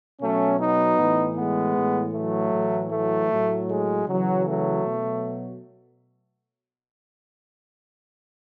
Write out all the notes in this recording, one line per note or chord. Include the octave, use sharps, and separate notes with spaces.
B2 F#3 A3 C#4
B3 D#4
A2 E3
G#3 B3
A2 E3
F#3 A3
A2 E3
F#3 A3
A2 F#3
G#3
C#3 E3 F#3
F#3 A3
B2 F#3